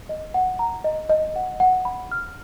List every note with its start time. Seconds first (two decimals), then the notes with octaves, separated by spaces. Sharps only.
0.09 D#5
0.34 F#5
0.59 A#5
0.84 D#5
1.10 D#5
1.36 F#5
1.60 F#5
1.85 B5
2.11 F6